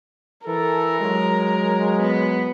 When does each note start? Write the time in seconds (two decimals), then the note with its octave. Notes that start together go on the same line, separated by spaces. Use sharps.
0.46 E3 A4 A#4
0.99 F#3 G#3
2.01 B3